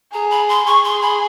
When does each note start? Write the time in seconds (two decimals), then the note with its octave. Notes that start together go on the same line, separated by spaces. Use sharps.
0.13 G#4 A#5
0.30 B5
0.49 C6
0.66 G#4 C#6
0.84 C6
1.02 B5